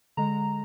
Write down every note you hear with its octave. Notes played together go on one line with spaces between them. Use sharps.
D3 G#3 A#5